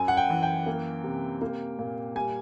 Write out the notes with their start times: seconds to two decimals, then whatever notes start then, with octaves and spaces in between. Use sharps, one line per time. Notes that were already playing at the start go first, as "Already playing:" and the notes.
Already playing: F#2 G#5
0.08 F#5
0.17 G5
0.30 E3
0.43 G5
0.66 A#3
1.04 C3
1.42 A#3
1.79 A#2
2.15 G3 G#5